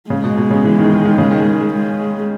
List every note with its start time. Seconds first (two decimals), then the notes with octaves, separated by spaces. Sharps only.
0.10 C#3 G#3
0.24 B2
0.37 B2
0.51 C#3
0.64 E3
0.78 D#3
0.92 D#3
1.05 D#3
1.18 C#3
1.31 D#3
1.73 G#3